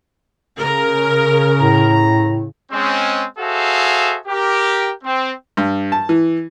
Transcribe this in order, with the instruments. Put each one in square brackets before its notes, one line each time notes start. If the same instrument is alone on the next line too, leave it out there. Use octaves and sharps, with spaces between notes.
[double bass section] C#3 [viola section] A#4
[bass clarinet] A2 [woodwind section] A#5
[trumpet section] G#3 C4 C#4
F#4 G#4 A4 C5 E5 F5
G4 A#4
C4
[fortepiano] G2
A5
E3